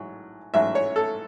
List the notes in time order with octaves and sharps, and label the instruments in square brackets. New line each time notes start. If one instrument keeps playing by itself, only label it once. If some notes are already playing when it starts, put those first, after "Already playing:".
Already playing: [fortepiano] A1 G#2 F#3
A1 G#2 F#3 E5
C#5
A4